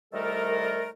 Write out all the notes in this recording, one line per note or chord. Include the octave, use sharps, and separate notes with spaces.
C2 D#3 G3 A3 A4 A#4